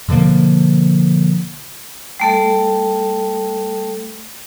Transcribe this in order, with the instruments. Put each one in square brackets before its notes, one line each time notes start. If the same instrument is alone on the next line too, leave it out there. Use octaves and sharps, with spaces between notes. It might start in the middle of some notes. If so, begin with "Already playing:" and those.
[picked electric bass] B2 D3 F3 A#3
[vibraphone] G3 A3 A4